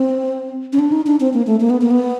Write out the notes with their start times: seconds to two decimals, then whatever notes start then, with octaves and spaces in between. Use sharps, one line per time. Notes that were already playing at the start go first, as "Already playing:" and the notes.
Already playing: C4
0.73 C#4
0.79 D4
0.92 D#4
1.06 D4
1.20 C4
1.33 A#3
1.47 A3
1.60 A#3
1.70 B3
1.81 A#3
1.91 B3